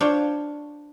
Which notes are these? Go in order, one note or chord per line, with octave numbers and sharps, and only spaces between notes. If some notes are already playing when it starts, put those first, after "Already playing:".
D4 F4 C5 C#5